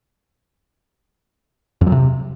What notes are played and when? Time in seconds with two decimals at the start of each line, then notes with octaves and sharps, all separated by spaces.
1.81 F2
1.87 F#3
1.92 C3